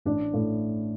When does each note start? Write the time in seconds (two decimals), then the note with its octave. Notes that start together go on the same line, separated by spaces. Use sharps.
0.05 A1 D4
0.34 A2